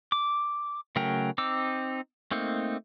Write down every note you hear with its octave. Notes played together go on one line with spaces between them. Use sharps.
D6
C#3 F#3 A3 A#4 G5
C4 D#4 D6 E6
A3 A#3 C4 D#4